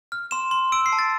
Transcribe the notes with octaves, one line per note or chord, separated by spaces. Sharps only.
F6
C6 E7
C6
E6 D7
C7
A5
A6